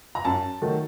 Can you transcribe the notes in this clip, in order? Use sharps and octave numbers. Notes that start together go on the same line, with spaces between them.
A#5
F#2 A5
D#3 F#3 A3